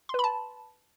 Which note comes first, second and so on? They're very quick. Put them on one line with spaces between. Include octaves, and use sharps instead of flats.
C6 B4 B5 A5